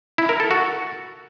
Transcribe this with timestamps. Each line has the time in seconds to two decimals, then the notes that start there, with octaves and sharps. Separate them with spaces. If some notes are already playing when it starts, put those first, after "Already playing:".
0.18 E4
0.29 A#4
0.40 A4
0.51 F#4